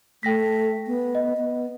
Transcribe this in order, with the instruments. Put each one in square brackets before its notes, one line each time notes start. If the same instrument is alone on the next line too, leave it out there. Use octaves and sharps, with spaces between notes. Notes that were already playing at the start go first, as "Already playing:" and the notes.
[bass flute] A3 [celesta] G5 A#6 B6
[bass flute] B3
[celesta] D#5
[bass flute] B3